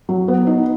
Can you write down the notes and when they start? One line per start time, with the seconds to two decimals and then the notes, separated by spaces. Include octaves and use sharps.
0.09 F#3
0.28 B3
0.47 D#4